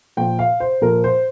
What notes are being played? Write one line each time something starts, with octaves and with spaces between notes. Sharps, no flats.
A#2 F3 G5
F5
C5
A#2 F3 A#4
C5